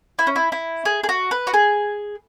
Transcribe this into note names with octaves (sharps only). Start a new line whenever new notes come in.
E4
C#4
E4
E4
G#4
G#4
F#4
B4
F#4
G#4